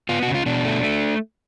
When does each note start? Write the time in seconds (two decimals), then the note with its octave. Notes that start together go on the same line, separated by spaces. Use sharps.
0.09 B3 F4
0.22 C#3 F#4
0.35 F4
0.46 B2 D4
0.65 A3
0.83 A3